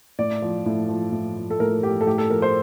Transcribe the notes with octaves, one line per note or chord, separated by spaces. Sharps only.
A2 D5
F3
A2
F3
A2
F3
A4
A2 A#4
F3 G4
A4
A2 G4
A4
F3 A#4
C5